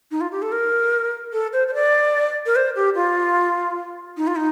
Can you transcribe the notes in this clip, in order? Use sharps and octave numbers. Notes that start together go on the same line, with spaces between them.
D#4
F4
G4
A4
A#4
A4
C5
C5
D5
A#4
C5
G4
F4
D#4
F4
D#4